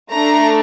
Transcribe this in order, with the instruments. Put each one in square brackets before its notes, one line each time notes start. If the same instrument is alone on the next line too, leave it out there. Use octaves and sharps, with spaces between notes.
[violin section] A3 D4 A4 A#5